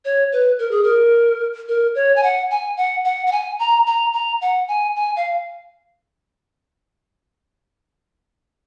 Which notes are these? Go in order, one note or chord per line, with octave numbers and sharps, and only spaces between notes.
C#5
B4
A#4
G#4
A#4
A#4
C#5
G#5
F#5
G#5
F#5
F#5
F#5
G#5
A#5
A#5
A#5
F#5
G#5
G#5
F5